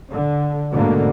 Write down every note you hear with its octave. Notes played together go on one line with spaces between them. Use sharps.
D3
D2 G#2 B2 D3 A#3